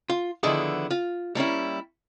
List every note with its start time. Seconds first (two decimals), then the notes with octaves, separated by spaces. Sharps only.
0.10 F4
0.43 D3 D#3 F3 B3 E4 G#4
0.91 F4
1.35 G3 A#3 C#4 E4